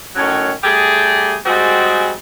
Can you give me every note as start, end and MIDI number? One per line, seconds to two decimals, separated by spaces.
0.15 0.51 45
0.15 0.51 51
0.15 0.51 54
0.15 0.51 61
0.63 1.35 55
0.63 1.35 57
0.63 1.35 67
0.63 1.35 68
1.46 2.12 55
1.46 2.12 56
1.46 2.12 60
1.46 2.12 66
1.46 2.12 68